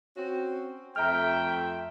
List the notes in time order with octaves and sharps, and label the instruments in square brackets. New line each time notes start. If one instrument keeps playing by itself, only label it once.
[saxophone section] C4 C#4 F#4
[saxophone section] F2 A3 E5 [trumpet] G5 [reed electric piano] A#5 F6